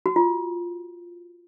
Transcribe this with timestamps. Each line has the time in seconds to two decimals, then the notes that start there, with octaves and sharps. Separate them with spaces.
0.06 F#4
0.16 F4